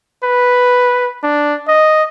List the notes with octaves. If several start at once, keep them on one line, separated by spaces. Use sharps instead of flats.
B4
D4
D#5